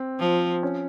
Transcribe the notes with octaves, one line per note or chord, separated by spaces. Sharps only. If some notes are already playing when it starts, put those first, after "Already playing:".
Already playing: C4
F3
C#4